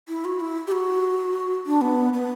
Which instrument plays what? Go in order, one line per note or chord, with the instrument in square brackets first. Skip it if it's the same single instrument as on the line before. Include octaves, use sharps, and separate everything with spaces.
[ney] E4
F#4
E4
G4
F#4
D4
B3
B3